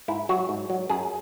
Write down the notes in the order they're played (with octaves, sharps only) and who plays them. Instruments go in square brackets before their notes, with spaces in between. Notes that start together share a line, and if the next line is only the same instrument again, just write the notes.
[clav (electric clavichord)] G#2 E4
F#3 F#4
G#2
F#3
F#2 G#4